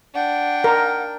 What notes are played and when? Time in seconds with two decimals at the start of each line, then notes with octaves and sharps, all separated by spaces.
0.14 D4 F#5 G5
0.64 A#4